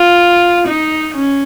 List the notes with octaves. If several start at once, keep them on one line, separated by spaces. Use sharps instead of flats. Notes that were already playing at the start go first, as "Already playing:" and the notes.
Already playing: F4
D#4
C#4